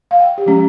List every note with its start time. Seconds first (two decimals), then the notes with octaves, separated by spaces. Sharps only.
0.11 F5
0.20 G5
0.38 G4
0.46 F3 G#3 C#4